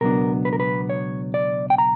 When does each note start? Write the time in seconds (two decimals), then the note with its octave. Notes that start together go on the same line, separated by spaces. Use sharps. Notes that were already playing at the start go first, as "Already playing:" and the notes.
0.01 C#2 B2 F#3 B3 D4 A#4
0.45 B4
0.53 A#4
0.60 B4
0.90 C#5
1.34 D5
1.70 G5
1.78 A#5